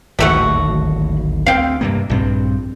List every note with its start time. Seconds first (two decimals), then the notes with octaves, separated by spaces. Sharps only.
0.19 D1 G#1 D#2 G3 A3 F#4
1.46 D2 C4 F5 G5
1.81 G2 C3 A#3
2.10 A#1 G2 C4